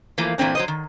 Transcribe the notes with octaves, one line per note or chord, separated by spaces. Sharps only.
E3 F3 A3 A#3
A#2 E3 A3 C4 D4
F#3 C5 D#5
D#3